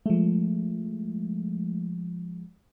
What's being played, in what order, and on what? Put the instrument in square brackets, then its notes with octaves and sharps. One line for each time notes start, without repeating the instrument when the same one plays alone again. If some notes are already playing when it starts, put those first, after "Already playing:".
[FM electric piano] F3 G#3 [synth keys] A3